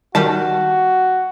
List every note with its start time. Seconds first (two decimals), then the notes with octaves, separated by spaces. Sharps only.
0.15 D#3 G3 F#4 A5